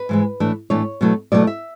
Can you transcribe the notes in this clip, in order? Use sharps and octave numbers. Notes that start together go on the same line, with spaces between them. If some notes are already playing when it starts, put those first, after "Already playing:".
Already playing: B4
G#2 E3 G#3
A2 E3 A3 D4
A2 E3 A3 D4 C#5
B2 F#3 A3 E4
B2 F#3 A3 E4 D5
E5